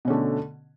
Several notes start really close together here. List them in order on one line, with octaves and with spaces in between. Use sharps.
B2 C#4 D3 A3